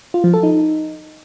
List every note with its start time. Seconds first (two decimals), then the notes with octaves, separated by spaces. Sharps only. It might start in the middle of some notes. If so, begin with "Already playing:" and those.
0.14 F4
0.24 F3
0.34 A4
0.43 D#4